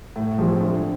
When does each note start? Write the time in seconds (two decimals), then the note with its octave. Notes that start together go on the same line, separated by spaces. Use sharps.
0.16 A2
0.38 F3 G#3 C4
0.60 D3